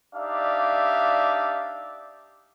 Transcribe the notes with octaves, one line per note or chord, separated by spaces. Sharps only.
D4 D#4 G4 D5 E5 F5